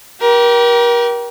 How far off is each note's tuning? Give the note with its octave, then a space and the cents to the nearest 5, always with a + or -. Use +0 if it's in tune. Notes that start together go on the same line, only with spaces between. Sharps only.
G4 -20 A#4 +35